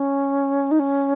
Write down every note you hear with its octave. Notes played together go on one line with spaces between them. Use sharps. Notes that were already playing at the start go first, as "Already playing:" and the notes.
Already playing: C#4
D#4
C#4